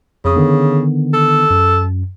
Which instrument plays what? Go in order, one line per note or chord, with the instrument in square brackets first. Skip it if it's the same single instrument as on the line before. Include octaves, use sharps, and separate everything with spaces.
[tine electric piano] F2 D#6 [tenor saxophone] C#3
[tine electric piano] D3 D#3 B3
[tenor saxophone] A4
[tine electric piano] F#2